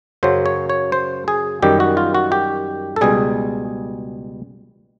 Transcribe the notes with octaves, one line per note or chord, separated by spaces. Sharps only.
F#2 C#3 F#3 C5
C#5
C#5
C5
G#4
F#2 D#3 G3 G4
F#4
F4
F#4
G4
A4
C#2 B2 G3 G#4